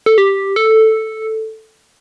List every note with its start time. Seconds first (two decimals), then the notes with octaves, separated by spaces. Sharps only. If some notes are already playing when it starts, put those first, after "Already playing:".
0.06 A4
0.18 G4
0.56 A4